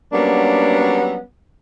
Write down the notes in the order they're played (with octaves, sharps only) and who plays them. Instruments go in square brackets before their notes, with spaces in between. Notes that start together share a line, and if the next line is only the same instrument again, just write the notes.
[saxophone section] F#3 G3 A#3 B3 C#4 D4